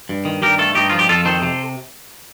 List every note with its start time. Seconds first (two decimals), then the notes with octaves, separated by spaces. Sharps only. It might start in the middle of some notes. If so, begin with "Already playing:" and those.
0.09 G2
0.25 D#3
0.42 G2 G4 A#4
0.59 A3 F4 A4
0.75 G2 D#4 G4
0.90 F3 F4
0.99 G4
1.09 F2 F4 A4
1.25 D#3 A4 C5
1.42 C3